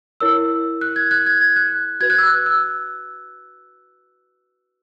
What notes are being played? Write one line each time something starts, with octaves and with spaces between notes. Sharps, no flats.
E4 A#4 C#5 E6
F#6
G#6
F#6
G#6
G#6
F#6
F#4 B4 G#6
F#6
E6
F#6
E6